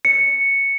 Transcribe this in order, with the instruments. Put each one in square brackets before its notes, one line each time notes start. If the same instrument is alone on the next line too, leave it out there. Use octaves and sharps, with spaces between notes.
[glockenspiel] C#7